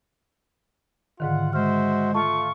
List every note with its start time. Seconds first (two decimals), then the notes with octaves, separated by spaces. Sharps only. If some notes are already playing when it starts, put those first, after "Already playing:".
1.20 G#2 D3 D#3 F4 F#5
1.53 G#3 F#4 C5 E5 F6
2.15 A3 F4 A5 C#6